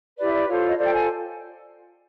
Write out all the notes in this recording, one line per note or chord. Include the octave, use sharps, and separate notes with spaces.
E4 G4 B4 D5
D5
F4 A4 C5 C#5
D#5
F4 A4 C5 D5
G5
G#5